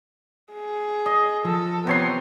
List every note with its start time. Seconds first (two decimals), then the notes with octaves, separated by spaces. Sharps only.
0.54 G#4
1.06 D#5
1.45 F3 A4
1.87 C3 B3 C#5 C6